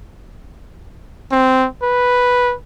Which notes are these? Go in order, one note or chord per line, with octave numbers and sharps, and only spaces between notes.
C4
B4